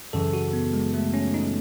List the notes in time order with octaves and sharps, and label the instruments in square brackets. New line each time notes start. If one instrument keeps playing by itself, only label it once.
[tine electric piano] F#2 C#3 E3 A4
F#4
B3
G#3
A3
C#4
D#4